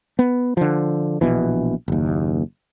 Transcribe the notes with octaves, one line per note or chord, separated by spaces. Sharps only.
B3
D3 F3
A#1 B2 E3
F#1 D#2